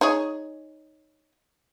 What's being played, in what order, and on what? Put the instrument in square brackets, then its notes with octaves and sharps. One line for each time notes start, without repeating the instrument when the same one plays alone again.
[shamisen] D#4 G#4 C#5